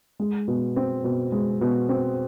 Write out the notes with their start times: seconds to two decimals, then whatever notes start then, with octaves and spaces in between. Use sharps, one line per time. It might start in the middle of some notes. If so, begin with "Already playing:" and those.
0.20 G#3
0.48 B2
0.76 C4
1.04 B2
1.32 G#3
1.61 B2
1.89 C4